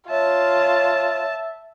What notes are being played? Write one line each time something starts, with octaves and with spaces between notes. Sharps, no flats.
F4 C#5 E5 A5